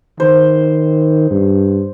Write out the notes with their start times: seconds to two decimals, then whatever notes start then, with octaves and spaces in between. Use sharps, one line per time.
0.20 D#3 C5
1.31 G2